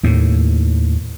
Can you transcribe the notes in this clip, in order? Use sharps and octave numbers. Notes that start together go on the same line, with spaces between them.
D#2 A2